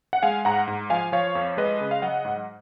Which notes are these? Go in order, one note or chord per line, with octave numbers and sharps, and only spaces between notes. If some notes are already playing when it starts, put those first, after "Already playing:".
F#5
G#3 F5 G#5
G#2 F#5 A#5
G#2
F3 F5 G#5
F3 C#5 F5
F2
G#3 B4 D#5
C#3
F5
F#3 D#5 F#5
G#2